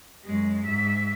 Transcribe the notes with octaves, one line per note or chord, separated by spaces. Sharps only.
F#2 G#3
G#2 E5